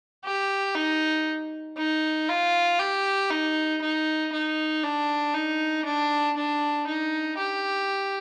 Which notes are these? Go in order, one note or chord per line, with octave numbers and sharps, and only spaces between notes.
G4
D#4
D#4
F4
G4
D#4
D#4
D#4
D4
D#4
D4
D4
D#4
G4